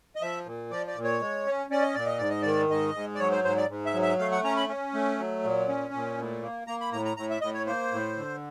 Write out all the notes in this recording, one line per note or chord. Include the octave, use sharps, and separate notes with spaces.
D#5
F3 E5
A#2
F3 D5
D5
A#2
C#5
G#3
C#4
C#4 D5
D#5
A#2 D5
D#5
G#2 D5
D#5
D#3 D5
G#2 D#5
G#2
D5
F#3 C#5
C5
G#2 C5
D5
G#2
E5
F#3
E5
A3 F5
F#5
C#4 A#5
B5
C#4
A3
F#3
A#2
C#4
A#2
A2
A#3
A#3 A#5
B5
A2 A#5
A#5
A2 A#5
E5
A2 D#5
C#5
A#3 C5
A2
D3